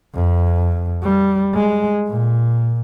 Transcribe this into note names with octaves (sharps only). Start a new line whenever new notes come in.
F2
G3
G#3
A#2